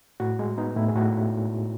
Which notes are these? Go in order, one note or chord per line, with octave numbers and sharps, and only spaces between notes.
A2 F#4
G#3
B3 D#4
A2 E4
G#4
A2 F#4